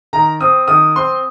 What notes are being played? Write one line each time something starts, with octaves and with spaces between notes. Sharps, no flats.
D#3 A#5
C4 D#6
D#3 D#6
C4 C6